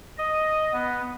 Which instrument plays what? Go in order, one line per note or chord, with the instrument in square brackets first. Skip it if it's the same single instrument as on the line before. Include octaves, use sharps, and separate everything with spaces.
[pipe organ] D#5
B3